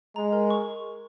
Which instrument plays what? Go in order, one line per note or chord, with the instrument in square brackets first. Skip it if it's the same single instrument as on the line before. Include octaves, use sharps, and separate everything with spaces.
[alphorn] G#3 [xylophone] A#5
[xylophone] A#4
C#6